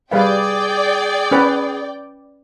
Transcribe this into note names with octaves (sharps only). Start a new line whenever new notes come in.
G3 G#4 B4 D5 F5 G5
C#4 B4